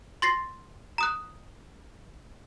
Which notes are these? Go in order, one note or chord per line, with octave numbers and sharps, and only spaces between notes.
C6 A6 A#6 C7
A#5 D#6 F#6